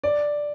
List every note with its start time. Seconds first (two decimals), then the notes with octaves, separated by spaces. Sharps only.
0.04 D5